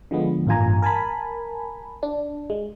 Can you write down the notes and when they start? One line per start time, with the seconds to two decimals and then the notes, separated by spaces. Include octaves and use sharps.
0.11 D3 F3 G#3 B3
0.47 A1 G2 A#3 F4 G#5 A#5
0.82 A#4 G#5 A5 B5
2.03 D4
2.50 G#3